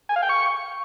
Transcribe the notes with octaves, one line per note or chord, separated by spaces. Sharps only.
G#5
F5
G5
C#6